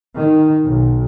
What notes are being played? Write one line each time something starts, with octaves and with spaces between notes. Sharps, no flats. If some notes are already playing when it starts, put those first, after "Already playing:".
D#3
B1